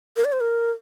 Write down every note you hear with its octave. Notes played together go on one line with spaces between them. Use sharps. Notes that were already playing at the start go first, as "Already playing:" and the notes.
A#4
D5
C5
A#4